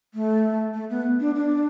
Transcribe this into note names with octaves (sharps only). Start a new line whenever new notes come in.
A3
A3
B3
D4
D4